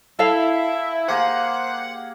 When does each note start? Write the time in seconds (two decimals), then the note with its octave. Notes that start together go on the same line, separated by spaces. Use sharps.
0.19 E4 A4 E5 F5
1.08 A#3 G4 G#4 C5 F#5